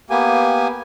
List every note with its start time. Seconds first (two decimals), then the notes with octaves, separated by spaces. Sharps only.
0.10 A#3 B3 G4 G#5